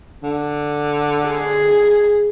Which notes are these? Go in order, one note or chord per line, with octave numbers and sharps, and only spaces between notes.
D3
G#4